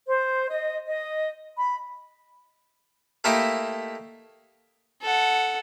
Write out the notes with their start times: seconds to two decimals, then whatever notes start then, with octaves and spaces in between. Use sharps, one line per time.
0.07 C5
0.50 D#5
0.86 D#5
1.56 B5
3.24 A3 A#3 D#4 E4 G4 D#5
5.02 A4 F#5